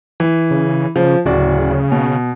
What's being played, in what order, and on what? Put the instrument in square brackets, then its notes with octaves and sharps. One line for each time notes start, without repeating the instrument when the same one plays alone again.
[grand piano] E3
[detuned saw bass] C#3
[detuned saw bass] C#3 [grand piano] F3
[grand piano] D1 F#4 D5 [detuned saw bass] C#3
[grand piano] B2